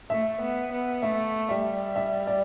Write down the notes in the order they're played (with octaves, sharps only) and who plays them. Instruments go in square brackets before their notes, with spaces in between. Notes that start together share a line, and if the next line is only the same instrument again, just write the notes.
[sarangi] A3 [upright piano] E5
[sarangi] B3
B3
[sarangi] A3 [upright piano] E5
[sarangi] G3 [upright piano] E5
[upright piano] E5
D5